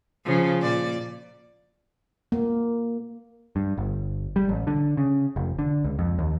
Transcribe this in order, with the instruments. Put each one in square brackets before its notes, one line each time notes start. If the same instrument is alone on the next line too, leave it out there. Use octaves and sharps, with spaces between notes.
[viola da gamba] C#3 F3
A#2 D5
[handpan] A#3
[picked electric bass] G2
G1
G3
A1
D3
C#3
F1
D3
C#2
F2
D#2